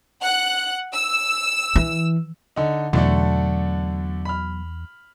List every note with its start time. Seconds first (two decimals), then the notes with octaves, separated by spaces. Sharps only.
0.22 F#5 F#6
0.93 E6
1.75 E3
2.56 D3 D#4
2.93 E2 B2 D3 F#3 A3 D4
4.25 B5 F6